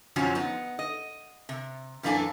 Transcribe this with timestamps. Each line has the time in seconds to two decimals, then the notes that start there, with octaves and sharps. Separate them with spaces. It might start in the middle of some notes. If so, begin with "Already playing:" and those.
0.16 F#2 C3 F3 F#3 C#4
0.35 B3 D#4
0.79 D#5
1.49 C3
2.03 F#2 E3 A#3 D4 A4 G#5